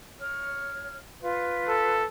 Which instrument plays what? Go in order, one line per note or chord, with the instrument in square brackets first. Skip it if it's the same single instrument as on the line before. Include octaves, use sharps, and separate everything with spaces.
[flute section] C#5 F6
F4 B4
[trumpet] A4